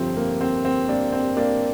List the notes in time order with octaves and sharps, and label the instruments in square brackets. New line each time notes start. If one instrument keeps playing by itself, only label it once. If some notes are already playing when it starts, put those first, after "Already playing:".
Already playing: [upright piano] G1 F2 C3 F3 C4
A#3
C4
C4
A#3 D4
C4
A#3 D4